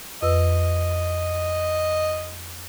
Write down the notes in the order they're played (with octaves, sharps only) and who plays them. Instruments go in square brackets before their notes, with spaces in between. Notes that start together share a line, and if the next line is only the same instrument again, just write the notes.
[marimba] F2 B4 E6 [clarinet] D#5